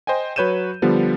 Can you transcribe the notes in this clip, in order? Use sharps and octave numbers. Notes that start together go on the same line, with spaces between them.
C5 D#5 G5 G#5
F#3 B4 C#5 G6 D#7 E7
D3 F3 G3 B3 D4